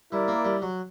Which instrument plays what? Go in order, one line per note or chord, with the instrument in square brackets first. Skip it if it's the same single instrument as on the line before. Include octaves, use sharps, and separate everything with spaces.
[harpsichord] G3 [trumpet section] E4 A#4 D5
[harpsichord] A#3
G3
F#3